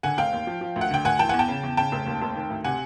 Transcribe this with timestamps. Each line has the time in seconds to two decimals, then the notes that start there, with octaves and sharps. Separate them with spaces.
0.03 D3 F#5 G#5
0.18 F1 F5 G5
0.33 D#2
0.47 F3
0.61 F3
0.76 D2
0.81 F#5
0.91 D3 G5
1.05 D2 F#5 G#5
1.19 E3 G5 A5
1.29 F#5 G#5
1.34 E2
1.39 G5 A5
1.48 C#3
1.63 E2
1.77 C#3 G5 A5
1.92 F1
2.06 D#2
2.21 F1
2.36 D#3
2.50 D2
2.64 C3 F#5 G#5